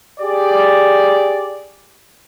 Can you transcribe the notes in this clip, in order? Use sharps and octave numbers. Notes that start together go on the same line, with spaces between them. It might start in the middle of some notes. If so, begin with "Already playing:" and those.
G4 G#4 D5